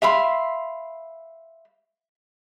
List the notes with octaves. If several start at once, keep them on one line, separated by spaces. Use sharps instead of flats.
E5 F5 B5 C6